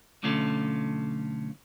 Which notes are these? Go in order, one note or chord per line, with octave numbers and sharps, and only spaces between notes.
B1 D3 A3 C#4 F4 A4